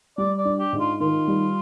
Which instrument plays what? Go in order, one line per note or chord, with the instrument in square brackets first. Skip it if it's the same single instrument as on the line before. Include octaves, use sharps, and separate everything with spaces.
[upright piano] G3 [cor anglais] D5
[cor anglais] D5
[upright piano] D4
[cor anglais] G4
[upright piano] G#2
[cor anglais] F4
[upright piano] D#3 [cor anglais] F4
[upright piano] G3